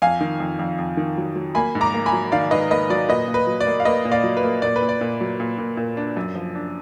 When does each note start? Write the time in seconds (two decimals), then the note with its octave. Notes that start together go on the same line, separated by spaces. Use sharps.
0.02 F2 F5 G#5
0.21 D#3
0.40 F2
0.59 F2
0.79 F2
0.97 D#3
1.18 F#3
1.36 F#3
1.55 A#3 G#5 B5
1.75 G#2
1.81 A#5 D6
1.94 A#3
2.06 G#5 B5
2.12 F#3
2.32 D#3 D5 F5
2.51 G#2 B4 D#5
2.71 A#3 B4 D#5
2.90 F#3 D5
3.09 A#2 B4 D#5
3.28 A#2
3.34 B4
3.47 F#3
3.61 D5
3.66 A#3
3.80 F5
3.85 A#3 B4 D#5
4.05 A#2
4.11 D5 F5
4.24 F#3
4.37 B4
4.44 A#3
4.62 A#2 D5
4.76 B4
4.82 A#2
4.89 D5
5.01 A#2
5.21 F#3
5.40 A#2
5.58 A#2
5.77 A#2
5.97 D4
6.17 F#2
6.36 F3
6.55 D4